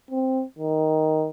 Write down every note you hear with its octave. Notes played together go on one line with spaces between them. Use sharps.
C4
D#3